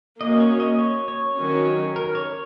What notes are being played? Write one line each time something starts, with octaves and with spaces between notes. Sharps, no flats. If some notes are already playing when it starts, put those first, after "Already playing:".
A#3 C#4 F#4 D#5
C#5
D#5
C#5
C#5
D#3 F#3 C#4
A#4
C#5